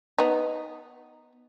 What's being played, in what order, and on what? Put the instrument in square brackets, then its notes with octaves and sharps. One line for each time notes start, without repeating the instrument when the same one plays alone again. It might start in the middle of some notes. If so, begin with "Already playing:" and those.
[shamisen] B3 D#4